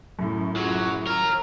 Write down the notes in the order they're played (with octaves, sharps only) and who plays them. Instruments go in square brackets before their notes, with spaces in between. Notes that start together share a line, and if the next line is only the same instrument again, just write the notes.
[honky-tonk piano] F#2 A2
[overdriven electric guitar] F#3 [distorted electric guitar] F4 G#4
[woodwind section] D#3 F6 [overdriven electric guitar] A#4 [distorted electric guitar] C#5 A#5